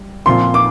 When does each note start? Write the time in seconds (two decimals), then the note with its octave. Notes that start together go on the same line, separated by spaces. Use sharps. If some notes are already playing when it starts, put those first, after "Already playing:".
Already playing: G3
0.26 A#2 F3 C4 F4 C6
0.54 D6